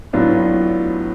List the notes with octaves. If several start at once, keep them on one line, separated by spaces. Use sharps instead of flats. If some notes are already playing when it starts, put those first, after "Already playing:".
A2 F#3 B3 D4 F4